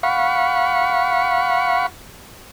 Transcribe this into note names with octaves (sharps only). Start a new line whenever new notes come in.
F5 F#5 B5 C#6